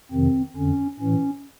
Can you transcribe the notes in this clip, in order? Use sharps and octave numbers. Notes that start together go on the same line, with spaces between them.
F2 C3 D#3 C4
F2 D3 C#4
A2 E3 C#4